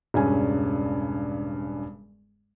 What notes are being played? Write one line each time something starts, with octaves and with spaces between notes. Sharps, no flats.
E1 G2 C#3 C#4 G#5